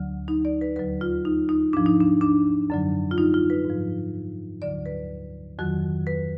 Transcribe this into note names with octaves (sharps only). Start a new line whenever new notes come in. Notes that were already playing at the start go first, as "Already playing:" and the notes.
Already playing: D2 D3 F#3
D#4
D5
B4
D#2 D3 F#3 B4
F4
D#4
D#4
G#2 F3 D4
D#4
D4
D4
F#2 D3 F#3
F4
D#4
F4
B4
G#2 F3
D2 D3 F#3 D5
B4
F2 D#3 F#3 F#4
B4